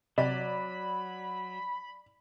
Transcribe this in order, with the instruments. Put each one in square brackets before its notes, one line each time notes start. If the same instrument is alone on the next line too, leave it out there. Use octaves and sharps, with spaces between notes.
[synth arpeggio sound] C3 [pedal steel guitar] F#3 [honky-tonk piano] D5 [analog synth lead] B5